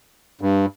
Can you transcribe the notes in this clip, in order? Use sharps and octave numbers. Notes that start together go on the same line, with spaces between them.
G2